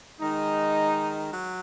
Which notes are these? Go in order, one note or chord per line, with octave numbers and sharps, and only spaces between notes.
D#3 G#3 D#4
F#3